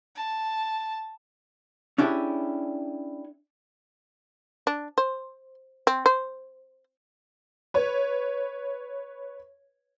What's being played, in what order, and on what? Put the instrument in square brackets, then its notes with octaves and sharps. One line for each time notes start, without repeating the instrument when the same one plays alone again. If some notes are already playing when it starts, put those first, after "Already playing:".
[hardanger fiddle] A5
[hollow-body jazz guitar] C#4 D4 E4 G4 G#4 C#5
[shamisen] D4
C5
C4
C5
[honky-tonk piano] B4 C#5